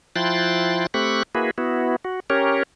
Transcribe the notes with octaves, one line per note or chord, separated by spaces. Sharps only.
F3 E4 G5 C6 F#6 A6
A3 C4 G4 B5 C#6 F#6
A#3 E4 F#4 G#4 B4
B3 E4 F#4
F#4
C#4 G4 A#4 C#5